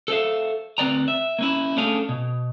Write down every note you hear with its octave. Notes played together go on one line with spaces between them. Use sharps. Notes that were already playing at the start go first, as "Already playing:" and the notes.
A4 C5 D5 E5 F5
D2 C4 B4 D5 G5 A#5
E5
A#3 C#4 E4
A3 C#4 D4 G#4 A4 F5
B2